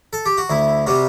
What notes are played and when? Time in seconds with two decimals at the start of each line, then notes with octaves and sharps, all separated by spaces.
0.13 A4
0.26 G4
0.38 F#4
0.50 D2 E4
0.87 C3 G3 F#4